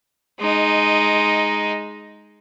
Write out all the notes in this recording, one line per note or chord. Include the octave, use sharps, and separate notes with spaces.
G#3 D#4